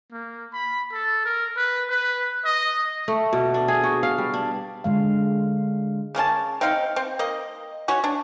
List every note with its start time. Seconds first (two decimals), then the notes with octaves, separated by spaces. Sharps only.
0.12 A#3
0.53 B5
0.93 A4
1.25 A#4
1.57 B4
1.90 B4
2.45 D#5
3.08 A3
3.33 B2
3.54 D4
3.68 G#4
3.84 F#4
4.03 F5
4.18 G3
4.34 D4
4.84 D3 G#3 F5
6.15 C#3 A#3 C#4 A5
6.61 C4 D#4 F5 G5
6.96 C4
7.19 A#3 D#5
7.88 C#4 F#4 C#5
8.04 D4